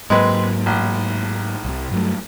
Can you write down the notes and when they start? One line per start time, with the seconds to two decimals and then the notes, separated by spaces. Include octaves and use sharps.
0.10 G#2 F#3 G#3 A#3 C4 B4
0.66 A1
1.65 C2 C3
1.91 G2 F#3 A3